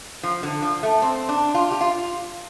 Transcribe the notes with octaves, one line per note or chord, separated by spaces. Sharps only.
F3
D3
F3
A3
C4
D4
F4
G4
F4